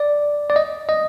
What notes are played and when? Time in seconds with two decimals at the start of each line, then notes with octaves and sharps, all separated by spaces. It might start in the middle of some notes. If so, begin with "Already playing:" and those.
Already playing: D5
0.50 D5
0.56 D#5
0.89 D#5